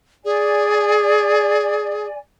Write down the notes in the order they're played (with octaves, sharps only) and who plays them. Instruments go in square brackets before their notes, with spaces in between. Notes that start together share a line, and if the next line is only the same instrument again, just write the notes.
[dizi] G#4 [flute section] D5 G#5